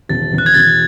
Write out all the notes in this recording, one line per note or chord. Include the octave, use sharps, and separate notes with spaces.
E1 A6
E1
F#6
G#6
E1 A6